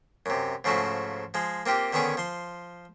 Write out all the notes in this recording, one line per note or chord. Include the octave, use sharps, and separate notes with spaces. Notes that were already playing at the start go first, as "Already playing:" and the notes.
F#2 C3
G#2 C#3 F3 A3 F#4
F3 G#3
A#3 C4 F4 G4
D3 D#3 B3 C#4 G#4
F3 C6